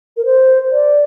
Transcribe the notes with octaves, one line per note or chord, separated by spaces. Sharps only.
A#4
C5
D5